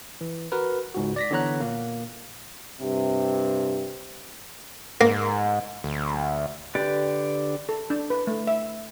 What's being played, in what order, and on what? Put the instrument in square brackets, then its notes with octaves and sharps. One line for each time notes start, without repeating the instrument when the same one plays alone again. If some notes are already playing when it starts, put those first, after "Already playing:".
[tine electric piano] E3
F#4 A#4 B4
C#2 G#2 F#4
D5 A#6 B6
D3 E3 B3 C#5 A#5 F#6
A#2 A#3
[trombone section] G2 C3
[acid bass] G#2 [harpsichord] A#3
[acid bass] D2
[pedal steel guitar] D3 G4 B4 D5
[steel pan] A4
D4
B4
A3
E5